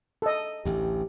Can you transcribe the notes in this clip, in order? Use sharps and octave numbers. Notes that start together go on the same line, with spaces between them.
A4 D#5
A1 D2 G4